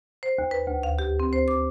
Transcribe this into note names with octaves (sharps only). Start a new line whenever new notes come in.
C5
D#2
B4
D2
F5
G4
C4
C5
D6